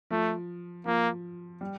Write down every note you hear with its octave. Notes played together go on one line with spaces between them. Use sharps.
F3 A3
F3 A#3
G3